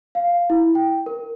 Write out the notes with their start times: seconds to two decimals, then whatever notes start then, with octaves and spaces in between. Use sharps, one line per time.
0.15 F5
0.50 E4
0.75 G5
1.06 A#4